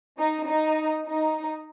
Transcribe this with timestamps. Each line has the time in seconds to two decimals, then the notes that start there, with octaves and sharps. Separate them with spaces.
0.19 D#4
0.48 D#4
1.06 D#4